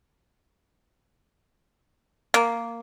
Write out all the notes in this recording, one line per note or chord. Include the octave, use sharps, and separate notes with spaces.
A#3